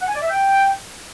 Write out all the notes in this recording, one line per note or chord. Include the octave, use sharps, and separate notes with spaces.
F#5
G#5
D5
E5
G5